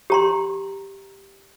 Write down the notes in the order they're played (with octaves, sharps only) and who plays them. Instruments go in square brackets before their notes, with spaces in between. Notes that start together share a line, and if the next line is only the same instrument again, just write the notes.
[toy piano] G4 A#5 C6